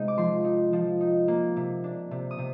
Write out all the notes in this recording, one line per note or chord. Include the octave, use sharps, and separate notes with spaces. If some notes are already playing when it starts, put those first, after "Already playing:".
Already playing: C3 G#3 D#4
D6
F3 C6
D#4
F3
D#4
A#3
C3
D4
C3
D#6
C3